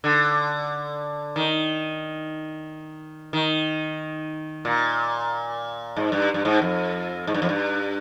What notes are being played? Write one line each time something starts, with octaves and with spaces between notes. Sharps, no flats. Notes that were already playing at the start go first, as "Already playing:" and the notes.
D3
D#3
D#3
A#2
G#2
G2
G2
G#2
F2
G#2
G2
F2
G2